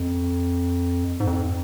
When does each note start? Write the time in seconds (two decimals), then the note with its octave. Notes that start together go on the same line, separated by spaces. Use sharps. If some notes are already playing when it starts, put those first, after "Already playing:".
Already playing: F2
1.20 G#2
1.27 F2